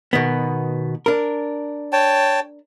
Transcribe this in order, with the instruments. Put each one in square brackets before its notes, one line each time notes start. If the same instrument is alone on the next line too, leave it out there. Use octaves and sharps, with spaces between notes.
[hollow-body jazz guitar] B2 D#3 B3
D4 A#4
[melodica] C#5 G5 A5